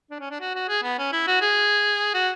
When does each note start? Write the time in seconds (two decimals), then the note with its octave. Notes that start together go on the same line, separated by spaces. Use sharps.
0.11 D4
0.20 C#4
0.30 D4
0.41 F#4
0.55 F#4
0.69 G#4
0.83 B3
0.99 C#4
1.12 E4
1.27 F#4
1.41 G#4
2.14 F#4